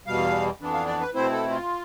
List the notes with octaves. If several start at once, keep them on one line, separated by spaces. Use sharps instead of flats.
E2 B2 G3 F5
F2 E3 B3 D4
F5
D5
B4
B2 A3 C4 E4 C5
A4
F4